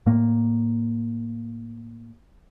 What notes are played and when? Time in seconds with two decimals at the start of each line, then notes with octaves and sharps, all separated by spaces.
0.06 A2 A#3